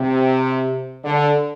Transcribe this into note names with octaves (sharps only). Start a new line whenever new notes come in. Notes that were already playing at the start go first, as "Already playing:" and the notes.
Already playing: C3
D3